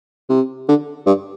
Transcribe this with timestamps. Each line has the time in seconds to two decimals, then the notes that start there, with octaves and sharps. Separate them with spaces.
0.29 C3
0.69 D3
1.07 G2